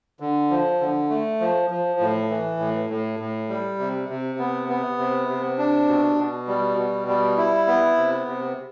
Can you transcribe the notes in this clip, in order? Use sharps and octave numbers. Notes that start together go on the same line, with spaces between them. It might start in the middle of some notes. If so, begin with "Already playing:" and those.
D3
F3
D3
A3
F3
F3
A2
E3
A2
A2
A2
G3
C3
C3
B3
B3
C3
C3
D4
B2
B2
G3
B2
G3
E4
B3
C3
C3